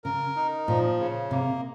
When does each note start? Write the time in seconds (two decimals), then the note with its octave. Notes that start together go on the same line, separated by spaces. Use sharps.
0.04 C#3 A#4
0.36 D#4
0.67 A#2 F3
0.99 C#3
1.31 C3 A#3